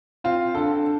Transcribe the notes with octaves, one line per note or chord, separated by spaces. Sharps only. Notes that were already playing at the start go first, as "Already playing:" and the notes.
C4 F4
D3 A4